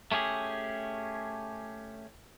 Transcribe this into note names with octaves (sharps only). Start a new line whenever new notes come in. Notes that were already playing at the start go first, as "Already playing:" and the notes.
A3 C#4 G4 G#4